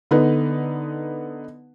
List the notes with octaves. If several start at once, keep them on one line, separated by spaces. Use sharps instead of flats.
D3 B3 D#4 B4